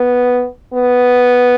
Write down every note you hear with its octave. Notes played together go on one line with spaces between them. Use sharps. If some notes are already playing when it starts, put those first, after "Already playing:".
Already playing: B3
B3